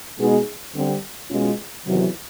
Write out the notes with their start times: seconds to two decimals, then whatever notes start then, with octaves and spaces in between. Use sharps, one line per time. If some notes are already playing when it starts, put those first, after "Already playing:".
0.18 B2 G#3 B3 D#4 G#4
0.74 D3 G3 C4
1.30 B2 G#3 C#4 F4
1.85 E2 C3 D#3 F#3